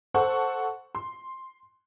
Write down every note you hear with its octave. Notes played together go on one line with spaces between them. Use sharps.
A4 C5 F#5 C#6
C6